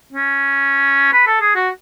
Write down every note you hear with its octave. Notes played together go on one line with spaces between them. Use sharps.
C#4
B4
A4
G#4
F#4